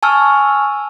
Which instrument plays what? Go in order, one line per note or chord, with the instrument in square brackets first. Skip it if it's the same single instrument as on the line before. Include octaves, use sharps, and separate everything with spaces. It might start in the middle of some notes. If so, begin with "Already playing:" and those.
[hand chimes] G#5 A5 C#6 E6 F6